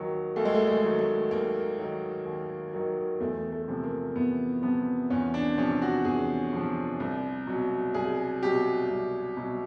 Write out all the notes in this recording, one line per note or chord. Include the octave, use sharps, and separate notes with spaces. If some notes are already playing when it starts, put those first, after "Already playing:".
Already playing: D#2 D#3 F#3
D#2 A3
G#3
A3
G#3
D#3 F#3
A3
D#2 A#3
D#3 F#3
D#2
D#3 F#3
E2 A3
A3
C3 F3
A#3
E2 B3
C3 F3 B3
E2 C#4
D4
C3 F3 C#4
F#4
E2 G#4
C3 F3
C2
B2 F#3
C2 G#4
B2 F#3 G4
C2
B2 F#3